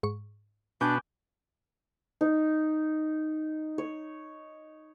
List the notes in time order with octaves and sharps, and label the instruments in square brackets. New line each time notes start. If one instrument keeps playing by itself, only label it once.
[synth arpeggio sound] G#2 C#6
[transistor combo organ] B2 B3 F#4 [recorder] D4 [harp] G#5 D6 G6
[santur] D#4
C#5